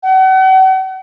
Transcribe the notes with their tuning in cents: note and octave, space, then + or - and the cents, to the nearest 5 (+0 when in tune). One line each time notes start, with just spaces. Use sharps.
F#5 +40